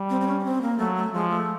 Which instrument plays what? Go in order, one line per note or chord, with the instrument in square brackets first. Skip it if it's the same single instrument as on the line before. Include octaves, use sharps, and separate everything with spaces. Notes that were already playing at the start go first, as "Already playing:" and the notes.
Already playing: [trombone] G3
[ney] C4
C4
C#4
C#4
C4
A#3
[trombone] F#3 [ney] A3
[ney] A3
[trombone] F3 [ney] G#3
[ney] A3